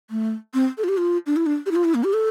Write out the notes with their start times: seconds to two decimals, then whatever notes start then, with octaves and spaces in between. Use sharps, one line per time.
0.10 A3
0.54 C4
0.78 A4
0.84 F4
0.89 G4
0.97 F4
1.26 D4
1.36 E4
1.46 D4
1.66 G4
1.71 E4
1.76 F4
1.84 E4
1.95 A#3
2.04 G4
2.13 A4